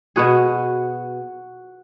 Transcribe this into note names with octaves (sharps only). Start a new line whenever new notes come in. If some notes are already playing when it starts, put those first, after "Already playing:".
B2 B3 F#4 G#4